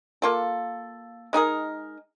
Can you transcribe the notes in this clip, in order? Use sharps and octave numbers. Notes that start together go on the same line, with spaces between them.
A#3 F4 A4
G#3 D#4 G#4 A#4